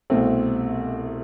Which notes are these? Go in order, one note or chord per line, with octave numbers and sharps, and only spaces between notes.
C2 B2 A3 C4